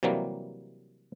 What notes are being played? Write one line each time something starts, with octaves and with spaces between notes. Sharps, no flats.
C3 E3 F#3 G3 A#3